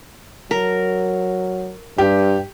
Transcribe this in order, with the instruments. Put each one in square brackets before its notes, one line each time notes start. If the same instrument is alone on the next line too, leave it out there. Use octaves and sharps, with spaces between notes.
[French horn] F#3 [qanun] A#4
[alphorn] G2 [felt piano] G4